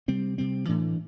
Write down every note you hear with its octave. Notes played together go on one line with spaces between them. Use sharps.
C3 G3 C4
C3 G3 C4
A2 E3 A3 D4